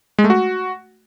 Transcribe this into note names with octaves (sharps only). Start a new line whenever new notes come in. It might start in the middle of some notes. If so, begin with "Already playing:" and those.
G#3
A3
F#4